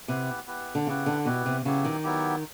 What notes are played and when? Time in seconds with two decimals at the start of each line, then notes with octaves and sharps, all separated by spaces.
0.08 C3 B3 E4 G4 B4
0.47 B3 E4 G4 B4
0.75 D3
0.87 C#3 B3 E4 G4 B4
1.06 D3
1.25 B2 B3 E4 G4 B4
1.46 C3
1.65 C#3 F#3 B3 E4 G4
1.85 D#3
2.03 F#3 B3 E4 G4